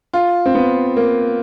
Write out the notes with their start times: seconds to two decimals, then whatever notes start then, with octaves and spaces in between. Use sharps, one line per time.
0.13 F4
0.46 C4
0.55 B3
0.97 A#3